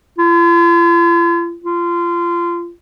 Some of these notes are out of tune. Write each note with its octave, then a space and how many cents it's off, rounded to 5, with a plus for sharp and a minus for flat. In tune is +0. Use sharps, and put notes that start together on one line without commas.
F4 -45
F4 -25